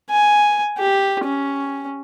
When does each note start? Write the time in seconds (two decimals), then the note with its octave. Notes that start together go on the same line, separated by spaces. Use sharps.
0.11 G#5
0.78 G4
1.25 C#4